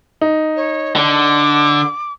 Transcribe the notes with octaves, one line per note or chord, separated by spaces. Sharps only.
D#4
C#5
D3 D6